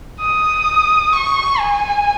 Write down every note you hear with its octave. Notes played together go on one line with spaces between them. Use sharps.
D#6
C#6
G#5